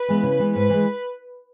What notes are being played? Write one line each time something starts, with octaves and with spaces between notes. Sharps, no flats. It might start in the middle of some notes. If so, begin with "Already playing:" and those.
Already playing: B4
E3 G#3 B3
C#3
E3 G#3 B3
G#2 B4
E3 G#3